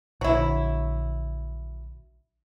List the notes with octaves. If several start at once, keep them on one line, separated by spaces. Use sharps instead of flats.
A#1 D3 F#3 E4